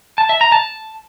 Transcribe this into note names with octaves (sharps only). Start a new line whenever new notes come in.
A5
E5
A#5
A5